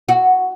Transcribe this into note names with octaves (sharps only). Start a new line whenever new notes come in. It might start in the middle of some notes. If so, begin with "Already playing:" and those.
F#4